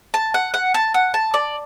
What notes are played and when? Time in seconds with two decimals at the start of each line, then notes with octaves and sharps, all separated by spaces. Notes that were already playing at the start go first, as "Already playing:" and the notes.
0.14 A5
0.34 F#5
0.54 F#5
0.74 A5
0.94 F#5
1.14 A5
1.34 D5